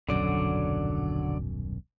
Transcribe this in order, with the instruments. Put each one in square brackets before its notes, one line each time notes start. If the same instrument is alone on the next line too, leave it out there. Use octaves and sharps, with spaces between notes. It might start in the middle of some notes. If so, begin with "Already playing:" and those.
[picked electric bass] D#1 B1 F#2 [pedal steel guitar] D3 F#3 D5